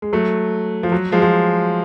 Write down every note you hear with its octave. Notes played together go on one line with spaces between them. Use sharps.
G#3
F#3 A3
F3
F#3
F3 G#3
F3